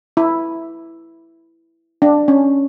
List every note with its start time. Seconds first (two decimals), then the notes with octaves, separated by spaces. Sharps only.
0.17 E4
2.02 D4
2.28 C#4